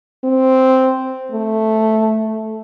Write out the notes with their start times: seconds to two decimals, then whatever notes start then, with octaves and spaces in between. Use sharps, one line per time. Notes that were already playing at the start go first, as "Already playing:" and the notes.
0.24 C4
1.32 A3